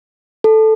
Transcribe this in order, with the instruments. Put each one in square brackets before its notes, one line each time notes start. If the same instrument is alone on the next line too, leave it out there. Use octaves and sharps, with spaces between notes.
[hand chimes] A4